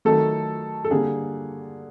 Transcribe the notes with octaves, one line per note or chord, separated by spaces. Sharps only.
D#3 F#3 A3 A4
A4
D3 G3 A#3 G#4